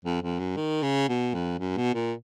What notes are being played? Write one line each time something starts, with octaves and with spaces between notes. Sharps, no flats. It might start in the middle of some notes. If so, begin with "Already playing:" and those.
F2
F2
F#2
D#3
C#3
B2
F2
F#2
B2
A#2